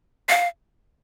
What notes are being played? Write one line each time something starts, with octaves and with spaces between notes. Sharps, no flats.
F5